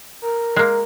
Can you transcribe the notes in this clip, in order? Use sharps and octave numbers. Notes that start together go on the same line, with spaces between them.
A#4
G#3 A#3